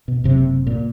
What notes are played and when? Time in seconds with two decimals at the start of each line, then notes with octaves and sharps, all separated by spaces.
0.08 B2
0.24 F#1 C3
0.67 A#2